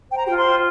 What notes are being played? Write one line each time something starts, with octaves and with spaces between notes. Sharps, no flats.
C5 G5
A#5
F4 G4 G5
C5 C6
F4